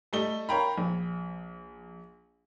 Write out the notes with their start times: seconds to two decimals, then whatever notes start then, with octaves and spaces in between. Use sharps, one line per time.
0.13 G3 A3 A4 D#5 G7
0.49 A#4 C#5 F5 G5 A#5 B5
0.78 A#1